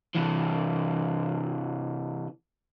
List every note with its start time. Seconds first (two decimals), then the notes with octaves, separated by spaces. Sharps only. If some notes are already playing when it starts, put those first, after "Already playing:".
0.15 C3 E3